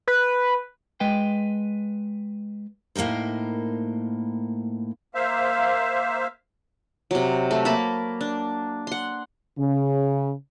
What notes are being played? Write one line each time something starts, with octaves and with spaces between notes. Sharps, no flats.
B4
G#3 B4 D#5 G5
A2 A#3 D#4 A#4 C5
A#3 C5 E5 F5
C3 F#3
A3
A#3 A#4 A5 B5
D4
F#5 C6
C#3